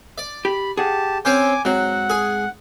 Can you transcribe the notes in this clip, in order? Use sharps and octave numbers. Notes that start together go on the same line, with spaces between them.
D5
G4 B5
G4 G#4 F#5 A5
C4 C#4 C5 G#5 D6
G#2 F#3 C4 F#5
G#4